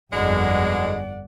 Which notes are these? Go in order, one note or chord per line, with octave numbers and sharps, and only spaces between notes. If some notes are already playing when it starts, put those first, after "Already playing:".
G1 F2 B2 D3 G#3 D5 F#5